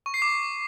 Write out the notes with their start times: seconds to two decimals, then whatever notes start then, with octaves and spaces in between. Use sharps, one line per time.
0.06 C#6
0.14 C7
0.22 D6